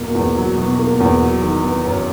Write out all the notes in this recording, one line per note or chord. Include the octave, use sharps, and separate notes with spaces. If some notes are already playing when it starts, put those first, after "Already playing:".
Already playing: E2 B2 F#3 A#3
E2
F#3
B2
A#3
E2
F#3
D#3
B3
F#2